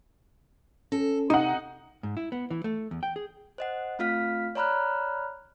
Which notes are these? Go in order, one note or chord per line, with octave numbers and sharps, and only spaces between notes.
C#4 A4
C3 D#4 F#5
G#2
E4
B3
E3
A3
E2
G5
G#4
C5 D#5 F#5
A3 C4 F4 F5 F6 B6
C#5 D5 A#5 B5 F6 F#6